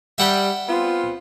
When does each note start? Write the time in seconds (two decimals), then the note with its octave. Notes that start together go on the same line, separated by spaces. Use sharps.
0.18 G3 E5 F#5 G5
0.69 B3 C4 F4